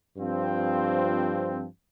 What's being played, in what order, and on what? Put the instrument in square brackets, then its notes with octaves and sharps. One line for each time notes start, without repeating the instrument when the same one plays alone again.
[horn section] G2 F3 C4 F4